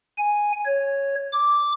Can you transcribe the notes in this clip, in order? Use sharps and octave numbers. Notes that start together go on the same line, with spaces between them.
G#5
C#5
D6